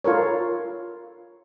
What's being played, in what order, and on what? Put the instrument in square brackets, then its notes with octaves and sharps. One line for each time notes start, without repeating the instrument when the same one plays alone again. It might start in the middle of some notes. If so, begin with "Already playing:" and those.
[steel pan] F4 A4 A#4 C#5